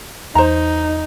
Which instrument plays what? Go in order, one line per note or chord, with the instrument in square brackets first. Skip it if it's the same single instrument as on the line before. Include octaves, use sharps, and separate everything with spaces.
[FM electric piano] E2 [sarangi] D#4 [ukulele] C5 A#5